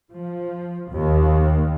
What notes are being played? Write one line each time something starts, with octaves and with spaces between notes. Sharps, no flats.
F3
D#2